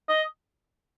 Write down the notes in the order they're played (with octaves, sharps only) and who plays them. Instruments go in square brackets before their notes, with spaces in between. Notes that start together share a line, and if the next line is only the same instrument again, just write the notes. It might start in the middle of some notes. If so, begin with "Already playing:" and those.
[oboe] D#5